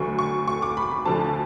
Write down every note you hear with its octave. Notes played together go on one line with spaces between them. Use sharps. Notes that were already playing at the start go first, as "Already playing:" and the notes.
Already playing: D2 D3 F#3 C#6
C#6
C#6
D6
B5
B5
D2 D3 F3 A5